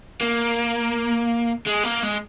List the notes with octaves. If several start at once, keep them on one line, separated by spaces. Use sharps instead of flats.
A#3
G#3
A#3
G#3